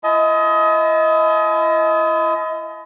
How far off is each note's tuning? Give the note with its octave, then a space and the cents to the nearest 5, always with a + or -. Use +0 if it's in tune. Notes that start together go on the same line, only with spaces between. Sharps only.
E4 +35 D#5 +25 A5 -45